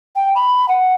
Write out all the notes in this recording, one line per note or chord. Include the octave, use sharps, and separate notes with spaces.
G5
B5
F#5